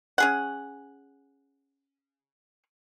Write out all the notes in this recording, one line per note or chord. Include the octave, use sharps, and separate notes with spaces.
C#4 G#4 F#5